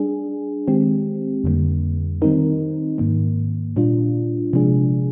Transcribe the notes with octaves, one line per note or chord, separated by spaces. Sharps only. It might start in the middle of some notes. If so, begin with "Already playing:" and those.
Already playing: G3 D4 G#4
D#3 G#3 C4 G4
F2 D3 G3 A#3
D#3 G3 C4 D#4 A#4
G#2 D#3 A#3
A#2 G3 D4 F4
C3 F3 G#3 D4 G#4